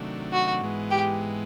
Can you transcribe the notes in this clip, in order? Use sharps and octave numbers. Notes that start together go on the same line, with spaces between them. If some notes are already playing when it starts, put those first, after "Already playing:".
Already playing: C3 D#3 F#3 A3 D4
F#4
G#2 E3 G#3 B3
G4